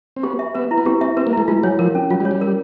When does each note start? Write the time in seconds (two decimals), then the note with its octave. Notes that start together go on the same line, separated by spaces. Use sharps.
0.16 C4
0.23 B3 G4
0.39 E5
0.55 B3 B4
0.71 E4
0.78 B3
0.86 C4 G4
1.01 C4 E5
1.17 C4 B4
1.27 A#3
1.33 A3 E4
1.48 G#3 F4
1.63 F#3 C#5
1.79 F3 A#4
1.95 C#4
2.10 F#3 F4
2.20 G3
2.25 C#5
2.31 G3
2.41 A#4